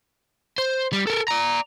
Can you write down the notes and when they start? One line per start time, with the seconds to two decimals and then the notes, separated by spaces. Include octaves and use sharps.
0.58 C5
0.93 G3
1.07 A4 A#4
1.28 D5 A#5